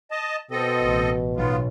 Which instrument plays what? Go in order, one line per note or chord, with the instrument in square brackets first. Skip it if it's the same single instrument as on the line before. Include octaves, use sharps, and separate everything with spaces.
[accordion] D#5 A5
[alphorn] B2 [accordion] C4 A4 D#5
[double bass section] A1
[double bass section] B1 [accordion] B3 F4